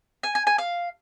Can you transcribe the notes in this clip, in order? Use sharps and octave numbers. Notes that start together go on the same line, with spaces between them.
G#5
G#5
G#5
F5